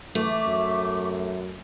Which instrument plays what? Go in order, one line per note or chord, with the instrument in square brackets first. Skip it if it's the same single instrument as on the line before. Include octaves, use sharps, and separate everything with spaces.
[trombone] E3 [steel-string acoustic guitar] A3 [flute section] E5 C#6 D6
[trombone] F#2